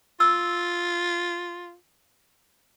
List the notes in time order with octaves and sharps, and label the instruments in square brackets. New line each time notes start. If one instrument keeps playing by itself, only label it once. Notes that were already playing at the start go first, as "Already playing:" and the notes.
[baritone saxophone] F4 [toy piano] E6